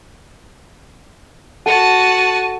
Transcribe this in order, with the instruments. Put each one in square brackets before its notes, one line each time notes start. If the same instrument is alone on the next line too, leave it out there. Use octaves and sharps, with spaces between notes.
[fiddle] F#4 A5 [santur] A4 [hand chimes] F#5 [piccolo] D#7